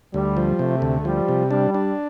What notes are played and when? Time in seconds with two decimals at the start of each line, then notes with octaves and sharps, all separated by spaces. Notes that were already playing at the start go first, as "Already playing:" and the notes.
0.14 D2 G3
0.37 F3
0.59 C3 A3
0.82 D2
1.05 F3 G3
1.28 C3
1.51 G3 D4
1.74 D4